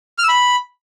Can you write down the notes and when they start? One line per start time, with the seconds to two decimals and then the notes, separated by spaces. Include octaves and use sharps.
0.18 F6
0.23 E6
0.29 B5